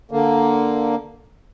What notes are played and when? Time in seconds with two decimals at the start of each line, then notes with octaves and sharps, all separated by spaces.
0.11 D3 A#3